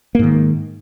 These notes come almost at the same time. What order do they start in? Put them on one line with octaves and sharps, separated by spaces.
A#3 G#2 D#3